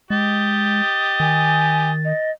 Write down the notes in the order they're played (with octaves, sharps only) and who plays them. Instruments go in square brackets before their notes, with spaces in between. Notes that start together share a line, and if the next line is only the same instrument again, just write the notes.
[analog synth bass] G#3 [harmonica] G4 D#5 [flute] A6
[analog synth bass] D#3 [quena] G#5
[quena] D#5